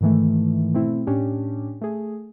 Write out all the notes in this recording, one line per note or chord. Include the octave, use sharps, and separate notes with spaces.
G#2 D#3 E3 A3
B2 A3 C4 E4
A2 C#4 D4 G4
A3 G#4